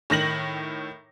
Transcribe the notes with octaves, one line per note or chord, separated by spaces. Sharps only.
A2 D#3 A#6 F#7